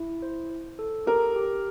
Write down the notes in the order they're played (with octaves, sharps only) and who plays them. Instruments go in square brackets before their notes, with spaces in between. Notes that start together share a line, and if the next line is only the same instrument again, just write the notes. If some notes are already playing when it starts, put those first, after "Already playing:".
Already playing: [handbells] E4
C5
C5
A4
[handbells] G4 [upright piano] A#4
[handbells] G4